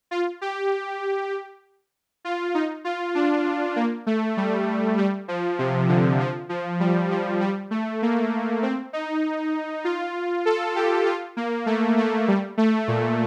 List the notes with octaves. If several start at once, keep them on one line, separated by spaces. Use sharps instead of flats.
F4
G4
F4
D#4
F4
D4
A#3
A3
G3
G3
F3
C3
D3
F3
F3
G3
F3
G3
A3
A#3
C4
D#4
F4
A4
G4
F4
A#3
A3
A3
G3
A3
A#2